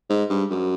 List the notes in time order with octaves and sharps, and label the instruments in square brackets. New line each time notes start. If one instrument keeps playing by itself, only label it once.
[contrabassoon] G#2
G2
F#2